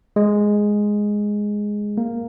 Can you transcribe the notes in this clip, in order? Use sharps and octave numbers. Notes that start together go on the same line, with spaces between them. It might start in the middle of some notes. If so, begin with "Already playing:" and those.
G#3
A#3